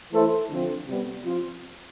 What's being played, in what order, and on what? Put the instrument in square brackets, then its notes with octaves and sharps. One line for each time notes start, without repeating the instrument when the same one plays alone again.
[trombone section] E3 A3 E4 A4 C5
D3 F3 C4
C3 G3 B3
F3 C4 F4